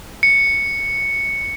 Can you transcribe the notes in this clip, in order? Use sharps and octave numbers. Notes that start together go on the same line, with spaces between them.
C#7